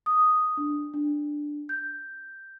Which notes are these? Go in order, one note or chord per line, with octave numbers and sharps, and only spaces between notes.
D#6
D4
D4
G6